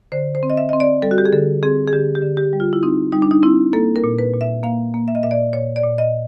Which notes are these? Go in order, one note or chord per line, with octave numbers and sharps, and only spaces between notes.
D3 C5
C5
C4
D#5
E5
C4 D#5
D5
G3 A4
F#4
G4
G#4
D3 A4
C4 G#4
G#4
D3 G4
G4
D3
G4
G3
F4
E4
C4 D#4
G3 D#4
D4
D#4
C4 E4
A#3 A4
A#4
A#2
B4
A#2
E5
A#3 F5
A#3
E5
D#5
A#2 E5
D5
A#2 C#5
D5
A#2
D#5